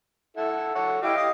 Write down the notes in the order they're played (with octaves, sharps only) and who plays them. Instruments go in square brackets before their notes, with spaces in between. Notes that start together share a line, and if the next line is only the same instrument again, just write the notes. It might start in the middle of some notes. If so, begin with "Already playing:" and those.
[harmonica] E4 A4 F#5
A4 C#5 F#5
[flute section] E4 G5 D6 [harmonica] G4 D#5 F5
[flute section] D#6